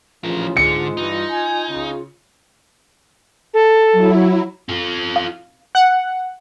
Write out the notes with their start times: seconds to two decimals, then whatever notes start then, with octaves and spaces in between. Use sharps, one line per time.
0.24 A1 D2 C#3 F3 F4 A#4
0.57 G#2 D3 G#3 C#7
0.97 G2 E3 D#4
1.30 G#5
1.69 C#3
3.54 A4
3.92 F#3 E4
4.69 F4 A4
5.16 F5
5.75 F#5